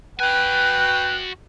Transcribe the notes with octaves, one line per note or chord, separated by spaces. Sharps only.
F#4 B4 G5 G#5 F#6